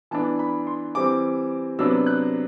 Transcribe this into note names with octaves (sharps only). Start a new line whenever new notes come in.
E3 B3 D4 A5
B5
C6
E3 G3 C4 D6
C3 F#3 B3 D4 E6
F#6